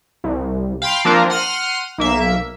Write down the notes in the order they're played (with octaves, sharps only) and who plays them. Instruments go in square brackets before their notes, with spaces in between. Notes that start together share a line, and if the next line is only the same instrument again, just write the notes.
[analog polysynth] C2
F5 G5 B5 C6 G6 D7
F3 A#3 C4 D4 F4 A#4
F#5 C6 F6 C7 D#7
B1 A#3 E5